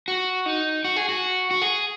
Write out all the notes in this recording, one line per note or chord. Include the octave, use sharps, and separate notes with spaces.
F#4
D#4
F#4
G#4
F#4
F#4
G#4